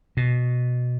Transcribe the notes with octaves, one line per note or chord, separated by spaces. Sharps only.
B2